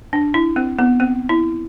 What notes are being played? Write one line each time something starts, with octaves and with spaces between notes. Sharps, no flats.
D4
E4
C4
B3
C4
E4